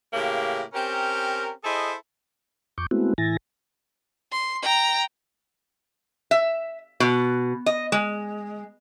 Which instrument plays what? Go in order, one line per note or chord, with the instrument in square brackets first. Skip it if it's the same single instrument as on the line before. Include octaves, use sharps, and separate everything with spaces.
[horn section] A2 C#3 A#3 G4
C4 C#4 G4 A#4
E4 G#4 A4 C5 D#5
[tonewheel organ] F2 C#6 D6 G6
G#3 A3 B3 C4 E4 F#4
A2 E3 E4 G#5 A6 A#6
[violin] C6
G5 A#5
[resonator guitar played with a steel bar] E5
B2
D#5
G#3